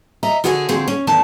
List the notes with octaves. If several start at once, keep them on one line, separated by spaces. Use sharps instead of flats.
D#5 E5 A#5
D3 F#4 G#4 C#5 E5 G#5
D3 F3 C4 F#4 G#4
C#4
E2 D#3 A3 A5